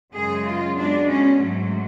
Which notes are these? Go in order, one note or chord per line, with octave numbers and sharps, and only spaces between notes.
F#2 C#3 G#3 G#4
F4
B2 G#3 D4
C#4
G#2 F#3 A3